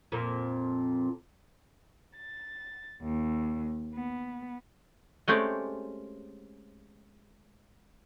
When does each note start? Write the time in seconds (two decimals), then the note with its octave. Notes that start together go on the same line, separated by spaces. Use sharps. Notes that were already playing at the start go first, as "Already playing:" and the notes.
0.12 F2 A#2
2.17 A6
3.02 D#2
3.94 B3
5.28 G#3 A3 C4 C#4 G4 D5